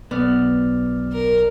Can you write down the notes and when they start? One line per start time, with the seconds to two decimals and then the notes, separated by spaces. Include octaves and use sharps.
0.11 B1 B3 D5 F6
1.13 A#4